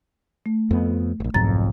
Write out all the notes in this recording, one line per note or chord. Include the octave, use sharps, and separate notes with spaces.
A3
F2 B3
E1 A#1
F#1 B1 F2 G#2 A#5 A6